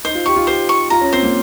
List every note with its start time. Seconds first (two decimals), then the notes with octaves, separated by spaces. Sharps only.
0.05 D#4 C5
0.15 F4
0.26 G4 C#6
0.36 F4
0.47 G4 C5
0.69 C#6
0.90 F4 A#5
1.01 C#4
1.13 C4 C5
1.23 A#3